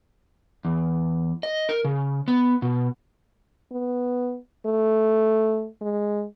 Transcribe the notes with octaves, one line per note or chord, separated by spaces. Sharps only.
E2
D#5
A#4
C#3
B3
B2
B3
A3
G#3